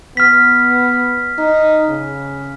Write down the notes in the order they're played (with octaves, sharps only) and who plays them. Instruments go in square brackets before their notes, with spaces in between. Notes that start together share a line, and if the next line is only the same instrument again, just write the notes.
[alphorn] B3 [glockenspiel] F6 B6
[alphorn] D#4
C#3